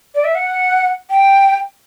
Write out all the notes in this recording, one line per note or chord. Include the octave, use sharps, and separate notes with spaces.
D5
E5
F#5
G5